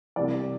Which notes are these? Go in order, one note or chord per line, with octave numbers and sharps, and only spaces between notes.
C2 C3 E3 D5